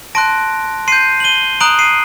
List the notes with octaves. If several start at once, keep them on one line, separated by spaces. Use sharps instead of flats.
A5 C6 F#6 A#6 D7
C6 G6 C7 D#7
F#7
D#7 G7
A#5 D#6 F#6 D7 F#7
C7 D#7